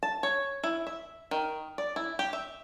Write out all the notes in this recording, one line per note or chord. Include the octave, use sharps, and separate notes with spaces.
A5
C#5
E4
E5
D#3
D5
E4
G4
E5